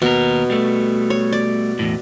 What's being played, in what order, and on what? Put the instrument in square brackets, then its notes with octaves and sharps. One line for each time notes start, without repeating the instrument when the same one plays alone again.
[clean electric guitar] D#2 A#4 [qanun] B2
[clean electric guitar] G3 A3
[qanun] C#5
D5
[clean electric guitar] E2 A2